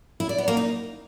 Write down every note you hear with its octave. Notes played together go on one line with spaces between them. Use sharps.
E4
D5
B3
A#3
D#4